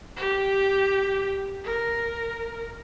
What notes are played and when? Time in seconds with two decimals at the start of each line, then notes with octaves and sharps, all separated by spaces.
0.17 G4
1.65 A#4